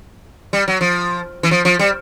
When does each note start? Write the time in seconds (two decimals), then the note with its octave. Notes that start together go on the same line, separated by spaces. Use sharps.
0.53 G3
0.68 F#3
0.81 F3
1.43 E3
1.51 F3
1.65 F3
1.79 G3